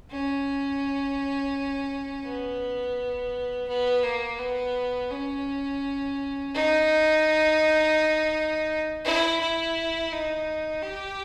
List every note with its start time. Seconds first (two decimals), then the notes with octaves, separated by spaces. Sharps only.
0.11 C#4
2.24 B3
3.68 B3
4.03 A#3
4.39 B3
5.11 C#4
6.54 D#4
9.04 E4
9.40 E4
10.12 D#4
10.82 G4